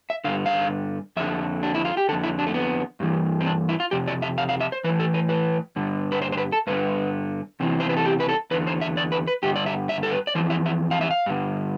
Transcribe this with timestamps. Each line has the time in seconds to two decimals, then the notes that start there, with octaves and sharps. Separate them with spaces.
0.10 E5
0.24 G2 D3 F5
0.46 F5
1.17 F2 D3 E5
1.63 D4
1.75 E4
1.85 F4
1.97 G4
2.09 D3 A4
2.12 F2
2.23 E4
2.39 D4
2.47 A3
2.54 B3
3.00 G2 E3
3.41 C4
3.47 D4
3.69 E4
3.80 F4
3.91 F2 C3 G4
4.07 D5
4.22 E5
4.38 F5
4.49 F5
4.60 E5
4.72 C5
4.84 E3 B4
4.89 A2
5.00 A4
5.14 B4
5.29 B4
5.76 G2 D3
6.12 B4
6.22 C5
6.32 C5
6.37 B4
6.52 A4
6.67 G2 D3 B4
7.60 E2 C3 E3
7.80 C5
7.89 B4
7.97 A4
8.06 G4
8.20 B4
8.29 A4
8.51 E2 D3 B4
8.67 C5
8.81 E5
8.97 D5
9.12 B4
9.27 B4
9.43 G2 D3 G4
9.56 D5
9.66 E5
9.89 E5
10.03 A4
10.11 B4
10.27 D5
10.35 F2 C3 E3 C5
10.50 E5
10.66 E5
10.91 F5
11.01 E5
11.11 F5
11.26 G2 D3